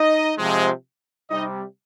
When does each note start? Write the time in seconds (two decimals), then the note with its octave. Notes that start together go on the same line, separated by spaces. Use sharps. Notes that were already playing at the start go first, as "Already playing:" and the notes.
Already playing: D#4 D#5
0.38 C3 F3 G#3
1.31 C3 G3 D#4 D#5